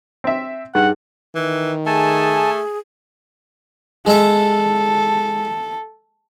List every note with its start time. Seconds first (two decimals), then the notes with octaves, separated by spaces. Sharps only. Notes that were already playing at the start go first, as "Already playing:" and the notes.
0.24 C4 E5
0.75 G2 D#4 G#4 F#5
1.35 D#3 E3
1.86 A3 G#4 G#5 A5
4.07 G#3 A4 E5